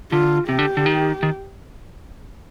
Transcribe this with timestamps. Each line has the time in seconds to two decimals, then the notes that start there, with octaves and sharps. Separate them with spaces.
0.12 D3 F4
0.49 C3 G4
0.59 D3
0.77 D3
0.86 D#3
1.23 D#3